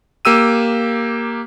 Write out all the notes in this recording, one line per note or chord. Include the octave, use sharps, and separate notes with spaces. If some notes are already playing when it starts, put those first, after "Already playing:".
A#3 G4 E6 D#7